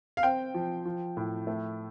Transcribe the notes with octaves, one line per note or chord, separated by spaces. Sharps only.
F5
C4 G5
F3
F3
A2
A3